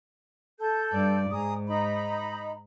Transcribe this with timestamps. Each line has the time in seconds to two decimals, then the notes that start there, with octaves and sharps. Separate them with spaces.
0.59 A4 G6
0.91 G2 D5
1.31 G#2 G#4 A#5 D#6
1.68 D#4 A#5 B5